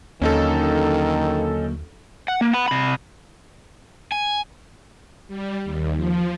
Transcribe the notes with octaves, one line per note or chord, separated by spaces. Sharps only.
D#2 D3 D#3 F#3 A#3 C#4 D#4 A4
F#5
A#3
F#5 B5
C3 B5
G#5
G3
D#2
F3